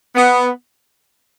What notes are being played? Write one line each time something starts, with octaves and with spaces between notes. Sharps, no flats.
B3